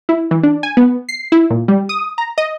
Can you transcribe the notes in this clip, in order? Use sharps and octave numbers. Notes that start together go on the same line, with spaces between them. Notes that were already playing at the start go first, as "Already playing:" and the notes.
E4
E3
D4
G#5
B3
C7
E4
A#2
G3
D#6
A#5
D#5